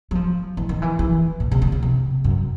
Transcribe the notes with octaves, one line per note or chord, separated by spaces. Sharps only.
F#3
F3
E3
D#3
E3
E3
A#2
C3
C#3
C#3
C3
F#2